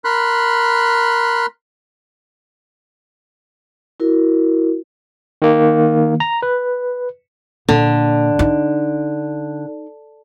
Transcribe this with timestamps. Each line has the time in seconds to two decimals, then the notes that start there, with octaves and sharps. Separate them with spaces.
0.04 A#4 B5 C6 F#6
4.00 E4 F#4 A#4
5.42 D#3 A#3
6.20 A#5
6.42 B4
7.69 A#2 D3
8.39 D#4